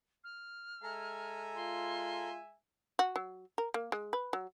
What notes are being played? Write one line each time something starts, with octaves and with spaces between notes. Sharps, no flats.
F6
G#3 A4 E5 G#5 A#5
F4 C6
F#4
F#3
A#4
A#3
G#3
B4
F#3